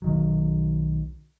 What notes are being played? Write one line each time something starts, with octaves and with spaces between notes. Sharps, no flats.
B1 D#3 F#3